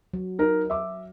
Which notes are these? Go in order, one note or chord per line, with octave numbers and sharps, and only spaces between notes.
F#3
D#4 A#4
E5 D6